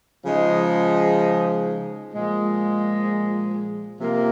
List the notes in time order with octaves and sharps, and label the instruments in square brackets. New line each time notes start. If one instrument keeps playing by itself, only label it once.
[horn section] C#3 F3 G#3 D#4
A#2 F3 G#3
C3 F3 A#3